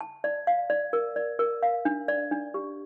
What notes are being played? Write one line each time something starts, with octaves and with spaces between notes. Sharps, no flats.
A5
D5
F5
D5
A#4
D5
A#4
F5
D4
D5
D4
G4